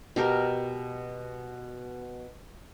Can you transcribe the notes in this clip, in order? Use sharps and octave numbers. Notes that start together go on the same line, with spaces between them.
B2 G4 A#4